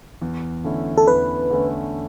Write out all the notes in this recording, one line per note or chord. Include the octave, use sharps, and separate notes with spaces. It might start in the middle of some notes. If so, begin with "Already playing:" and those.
E2
D3 A3 C#4 E4
A4
E2 B4
D3 A3 C#4 E4